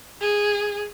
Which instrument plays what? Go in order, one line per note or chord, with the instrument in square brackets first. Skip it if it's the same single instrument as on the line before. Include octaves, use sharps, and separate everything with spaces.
[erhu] G#4